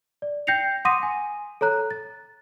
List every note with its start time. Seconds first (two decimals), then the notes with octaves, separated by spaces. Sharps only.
0.22 D5
0.47 G5 G6 A#6 C7 C#7 F7
0.85 F#5 C6 D6 D#6 A#6 D#7
1.03 G#5
1.61 A4 C#5 A#5 F#6
1.91 A6